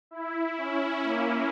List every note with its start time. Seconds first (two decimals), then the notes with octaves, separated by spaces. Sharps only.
0.11 E4
0.58 C#4
1.04 A#3